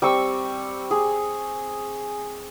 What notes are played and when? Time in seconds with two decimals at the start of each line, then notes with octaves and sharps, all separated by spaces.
0.02 G3 C4 C#6 E6
0.91 G#4